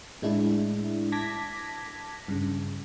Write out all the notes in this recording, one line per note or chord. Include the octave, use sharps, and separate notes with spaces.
A2 G#3 D4 E4
A5 D6 G#6 A#6 B6
G2 C#3